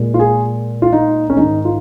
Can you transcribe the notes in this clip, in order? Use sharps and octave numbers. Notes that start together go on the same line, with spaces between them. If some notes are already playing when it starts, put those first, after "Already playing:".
Already playing: A#2 G#3
F4
G#4
F4
D#4
C#4
G#2 D#3 G#3 D#4
F4